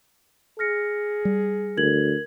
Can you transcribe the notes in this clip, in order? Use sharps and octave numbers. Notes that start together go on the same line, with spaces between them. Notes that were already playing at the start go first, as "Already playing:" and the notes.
G#4 F6 A#6 C#7
G3
D2 A#4 G#6 F#7